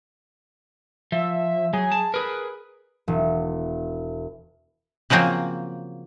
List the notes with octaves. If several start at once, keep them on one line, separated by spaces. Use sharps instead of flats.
F3 E5
F#3 G#4
A5
G#4 A#4 B4
E1
C#3 F3 F#3 A#3 C4